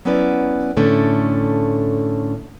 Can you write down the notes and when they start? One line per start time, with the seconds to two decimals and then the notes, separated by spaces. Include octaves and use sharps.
0.05 F#3 B3 C#4 E4 B4 D5
0.77 A2 D3 A3 C#4